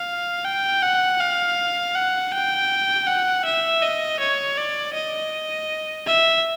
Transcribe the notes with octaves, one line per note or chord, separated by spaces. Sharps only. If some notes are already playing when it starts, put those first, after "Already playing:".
Already playing: F5
G5
F#5
F5
F#5
G5
F#5
E5
D#5
C#5
D5
D#5
E5